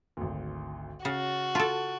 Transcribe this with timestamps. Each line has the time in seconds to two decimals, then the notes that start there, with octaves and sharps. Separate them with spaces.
0.17 G#1 D2
1.05 C#3 F#4 F6 A6 C7
1.55 F4 A4 A5 A6 D7